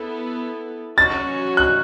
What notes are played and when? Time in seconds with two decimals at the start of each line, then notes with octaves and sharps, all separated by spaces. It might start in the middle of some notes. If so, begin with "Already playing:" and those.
Already playing: B3 E4 A4
0.98 F#3 C#4 F#4 C#5 A6
1.57 F#6